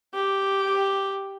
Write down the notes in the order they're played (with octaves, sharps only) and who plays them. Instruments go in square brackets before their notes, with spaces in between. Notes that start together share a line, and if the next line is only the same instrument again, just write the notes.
[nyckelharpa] G4